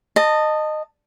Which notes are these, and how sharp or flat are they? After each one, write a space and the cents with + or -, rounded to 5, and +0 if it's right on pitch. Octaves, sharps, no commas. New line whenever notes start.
D#5 -15 A5 +20